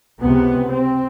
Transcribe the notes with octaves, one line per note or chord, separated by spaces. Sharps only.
C#2 C3 B3
C4